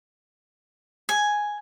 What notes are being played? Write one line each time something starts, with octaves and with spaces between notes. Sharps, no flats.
G#5